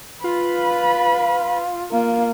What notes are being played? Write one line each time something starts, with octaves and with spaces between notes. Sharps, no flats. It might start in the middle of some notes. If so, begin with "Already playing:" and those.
F4 B4 B5
A#3 F4